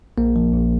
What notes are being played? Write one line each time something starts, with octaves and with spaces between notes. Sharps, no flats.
A#1 A#3
F3
A#1